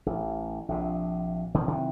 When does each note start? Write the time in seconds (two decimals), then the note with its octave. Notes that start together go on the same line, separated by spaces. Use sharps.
0.06 A1
0.69 A#1 C3
1.54 B2 D#3 F3
1.68 C3 D#3 E3 F#3